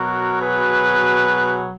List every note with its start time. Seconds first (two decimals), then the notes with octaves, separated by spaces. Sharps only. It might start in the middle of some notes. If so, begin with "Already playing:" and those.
Already playing: B2 F#3 F#4 A#4
0.40 G#4 B4